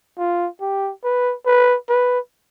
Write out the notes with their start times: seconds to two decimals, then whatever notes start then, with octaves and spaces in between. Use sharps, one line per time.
0.18 F4
0.61 G4
1.04 B4
1.46 B4
1.89 B4